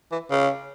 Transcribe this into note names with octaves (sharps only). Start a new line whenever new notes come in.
E3
C#3